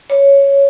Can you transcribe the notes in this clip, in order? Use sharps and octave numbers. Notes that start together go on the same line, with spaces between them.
C#5